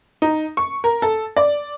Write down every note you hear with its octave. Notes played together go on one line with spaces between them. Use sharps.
D#4
C#6
A#4
A4
D5